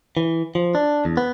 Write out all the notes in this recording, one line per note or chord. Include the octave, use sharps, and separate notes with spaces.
E3
F3
D4
E2
B3